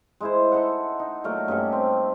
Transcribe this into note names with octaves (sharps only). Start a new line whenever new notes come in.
G#3 E4 C5
D#4 A4 E5 F#5
D#4
A#2 F#3 A3 A#4
G2 C#4 G4 A4
C4